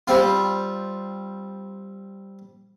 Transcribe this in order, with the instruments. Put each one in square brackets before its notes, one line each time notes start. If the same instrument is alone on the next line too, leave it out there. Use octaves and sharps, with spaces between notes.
[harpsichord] G3 C4 F4